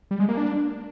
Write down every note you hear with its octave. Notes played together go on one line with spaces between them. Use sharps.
G3
G#3
A#3
D4